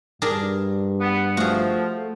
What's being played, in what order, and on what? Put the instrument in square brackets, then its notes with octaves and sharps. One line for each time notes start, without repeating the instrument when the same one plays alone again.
[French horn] G2 [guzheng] D4 G#4 A#4
[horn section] B3
[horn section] F3 [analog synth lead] A3 [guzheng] F#4 G#4